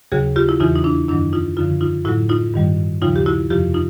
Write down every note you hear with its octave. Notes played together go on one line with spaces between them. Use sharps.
D#2 C#3 F#3 F#4 G#4
F4 G4
E4
E2 C#3 E3 D#4 F4
D#4
D4 E4
F#2 D#3 F#3 D4 E4
D#4 F4
F#2 D3 F3 D#4 F4
D#4 F4
A2 F#3 E4 F#4
D#4 F4
G2 D#3 G3
D#2 C#3 F3 D#4 F4
G4
E4 F#4
F2 C3 F3 F4 G4
D#4 F4